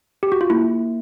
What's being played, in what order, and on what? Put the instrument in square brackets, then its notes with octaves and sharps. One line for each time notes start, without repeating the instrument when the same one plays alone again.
[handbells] G4
F#4
F4
[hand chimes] A#3 [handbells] E4